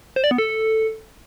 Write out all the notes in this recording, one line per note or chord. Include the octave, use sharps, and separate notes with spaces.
C5
D5
B3
A4